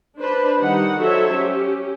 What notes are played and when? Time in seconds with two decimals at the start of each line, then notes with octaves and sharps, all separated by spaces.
0.18 D4 B4 C5
0.59 D#3 G3 D#4 F#5
1.01 F#3 F#4 A4 C5 C#5 E5
1.33 C#4 G4